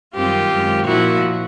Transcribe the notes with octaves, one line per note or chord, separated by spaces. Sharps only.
F#2 D#3 G3 C4 F4 G4
F#2 D#3 G#3
A#2 F3 A#3 E4 F#4